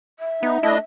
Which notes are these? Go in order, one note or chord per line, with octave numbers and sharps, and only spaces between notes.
E5
B3 D#4
A3 D4 E4 D#5